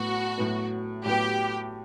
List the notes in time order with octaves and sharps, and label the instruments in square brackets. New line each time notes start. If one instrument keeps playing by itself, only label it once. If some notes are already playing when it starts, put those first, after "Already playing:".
Already playing: [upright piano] A2 F#3 B3 [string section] F#4
[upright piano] A2 F#3 B3
[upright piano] A2 F#3 B3 [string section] G4